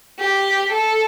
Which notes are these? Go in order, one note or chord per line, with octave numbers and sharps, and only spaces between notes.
G4
A4